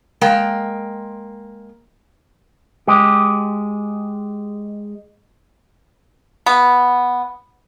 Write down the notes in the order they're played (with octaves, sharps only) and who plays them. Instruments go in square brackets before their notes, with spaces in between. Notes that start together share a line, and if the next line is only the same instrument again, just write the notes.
[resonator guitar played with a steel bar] G#3 A#3 G5
[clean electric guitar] G#3 G4
[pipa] B3